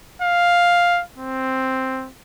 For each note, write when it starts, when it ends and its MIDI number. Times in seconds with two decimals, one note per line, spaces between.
0.22 1.02 77
1.18 2.09 60